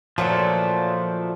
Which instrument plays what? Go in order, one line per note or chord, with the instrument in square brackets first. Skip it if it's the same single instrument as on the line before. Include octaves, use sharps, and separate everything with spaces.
[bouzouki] A#2 F#3 A3 D4 [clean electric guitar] F3